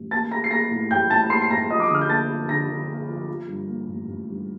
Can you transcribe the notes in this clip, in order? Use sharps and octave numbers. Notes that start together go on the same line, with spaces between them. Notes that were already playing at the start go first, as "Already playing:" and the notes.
Already playing: A1
A#3 A5 A6
A#3 A#5 A#6
C7
A#3 A#5 A#6
A2
A1 G5 G6
A2 A5 A6
A#3 C6 C7
C7
A1 A#5 A#6
F3 D#5 D#6
D6
D#6
D3 F6
G6
A#3 A5 A6
F3
D3 A#5 A#6
D3
A#3
F3
F3
G2
A#3
A1
A1
G2